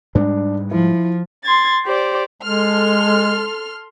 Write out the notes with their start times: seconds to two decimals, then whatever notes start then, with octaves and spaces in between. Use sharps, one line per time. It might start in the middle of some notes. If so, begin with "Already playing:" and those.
0.15 G#2 G3 G#3 D4
0.71 F3 E4
1.44 C6 G#6 A6
1.85 G4 C5 D5
2.42 G#3 A4 C6 F6